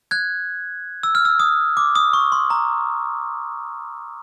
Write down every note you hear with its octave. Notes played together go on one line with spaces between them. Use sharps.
F#6 G#6
E6
F6
E6
D#6
D6
D#6
C#6
C6
A#5